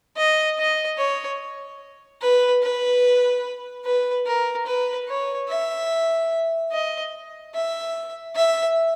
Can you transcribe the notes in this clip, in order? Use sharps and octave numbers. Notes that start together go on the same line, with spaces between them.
D#5
D#5
C#5
B4
B4
B4
A#4
B4
C#5
E5
D#5
E5
E5